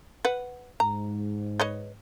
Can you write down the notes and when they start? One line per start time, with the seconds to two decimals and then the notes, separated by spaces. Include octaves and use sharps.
0.25 B4 F#5
0.80 G#2 A#5
1.60 B4 C#5 D#5